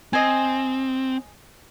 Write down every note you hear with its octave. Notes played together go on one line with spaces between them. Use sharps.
C4 D#5 G#5